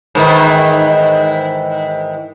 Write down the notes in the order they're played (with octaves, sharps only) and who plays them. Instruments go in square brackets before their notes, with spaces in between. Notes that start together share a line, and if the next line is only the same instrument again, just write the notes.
[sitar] G#2 D#3 E3